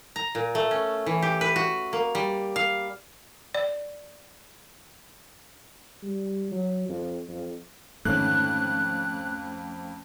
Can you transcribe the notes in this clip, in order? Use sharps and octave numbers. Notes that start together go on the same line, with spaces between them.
A#5
A#2
A3
C#4
E3
G4
B4
F#4
A#3
G3
F5
D5
G3
F#3
F2
F2
F2 G#2 D3 D#3 A3 C#4 F#6